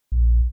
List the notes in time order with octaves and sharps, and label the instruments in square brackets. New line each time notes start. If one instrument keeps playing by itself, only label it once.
[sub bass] A#1